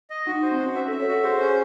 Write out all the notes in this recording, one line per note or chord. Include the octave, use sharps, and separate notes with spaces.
D#5
D#4 F#4
C5
C4
C#4 F#4
C5 E5
A4
E5
C#5
F#4 A4
G#4 C5
C#4